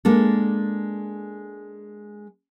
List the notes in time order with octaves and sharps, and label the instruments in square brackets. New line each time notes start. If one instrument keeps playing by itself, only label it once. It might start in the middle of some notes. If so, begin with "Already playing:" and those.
[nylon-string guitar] G#3 A#3 D4 A4